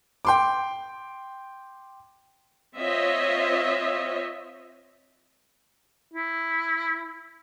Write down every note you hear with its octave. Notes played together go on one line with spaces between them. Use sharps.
G5 C6 D6
C4 F4 C5 C#5 D#5 E5
E4